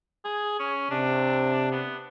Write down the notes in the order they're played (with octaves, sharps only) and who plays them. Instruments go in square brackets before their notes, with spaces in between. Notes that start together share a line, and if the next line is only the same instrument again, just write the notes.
[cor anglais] G#4
C#4
[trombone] C3 [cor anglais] D4
[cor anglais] B3